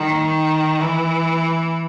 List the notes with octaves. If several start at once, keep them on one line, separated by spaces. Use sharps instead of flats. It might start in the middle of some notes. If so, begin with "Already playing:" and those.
Already playing: D#3
E3